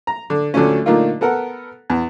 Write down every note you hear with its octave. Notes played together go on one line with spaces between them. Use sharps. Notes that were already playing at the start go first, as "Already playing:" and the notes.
A#5
D3
D2 D3 F3 F#3 A3 C#4
A#2 D3 A3 A#3 D#4 F4
B3 A4 A#4 F#5
E2